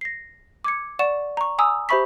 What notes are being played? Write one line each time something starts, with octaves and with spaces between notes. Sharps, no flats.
A#6 C7
D6 G#6 C#7
D5 F#5 C#6 E7
A#5 C#6
G#5 A#5 D#6 E6
G4 C5 E5 B5 C#6 B6